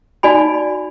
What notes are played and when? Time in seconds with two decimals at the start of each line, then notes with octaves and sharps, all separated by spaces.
0.23 D#4 F#4 D5 G#5 B5